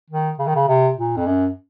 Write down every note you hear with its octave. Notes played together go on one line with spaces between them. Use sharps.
D#3
C#3
D#3
C#3
C3
A#2
F2
F#2